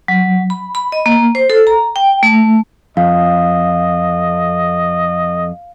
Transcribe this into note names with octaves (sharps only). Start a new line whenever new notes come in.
F#3
B5
B5
D#5
A#3
C5
A4
A#5
G5
A3
F2 D#5 F5